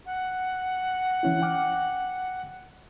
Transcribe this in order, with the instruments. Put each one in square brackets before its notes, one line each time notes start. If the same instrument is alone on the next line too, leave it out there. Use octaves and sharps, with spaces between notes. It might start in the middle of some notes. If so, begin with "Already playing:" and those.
[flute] F#5
[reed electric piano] E3 C#4 E4
G5 D6 F6